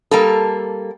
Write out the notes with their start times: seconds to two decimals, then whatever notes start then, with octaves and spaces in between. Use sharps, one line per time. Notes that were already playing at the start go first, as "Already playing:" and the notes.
0.11 G3 A#3 A4